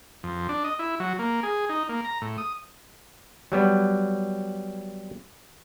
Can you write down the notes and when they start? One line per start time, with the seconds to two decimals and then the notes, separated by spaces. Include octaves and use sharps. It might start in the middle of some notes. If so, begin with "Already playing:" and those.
0.23 F2
0.49 D4
0.64 D#5
0.79 E4
1.00 F#3
1.19 A#3
1.43 G#4
1.69 D#4
1.89 A#3
2.04 A#5
2.22 A2
2.38 D#6
3.52 F#3 G3 B3